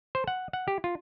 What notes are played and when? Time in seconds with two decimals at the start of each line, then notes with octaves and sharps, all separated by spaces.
0.15 C5
0.28 F#5
0.53 F#5
0.68 G4
0.84 F4